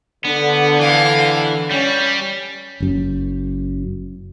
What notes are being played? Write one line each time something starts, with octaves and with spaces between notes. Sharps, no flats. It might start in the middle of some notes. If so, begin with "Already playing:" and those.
D3 B3
E3 B3 F5
G3 C#4
F#1 F#2